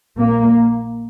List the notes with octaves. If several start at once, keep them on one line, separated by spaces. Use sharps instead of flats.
A#1 A#2 A#3